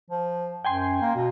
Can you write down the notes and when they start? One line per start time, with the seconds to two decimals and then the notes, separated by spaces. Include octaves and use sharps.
0.10 F3
0.65 F#2 G5 G#5 C6
1.01 A#3
1.15 B2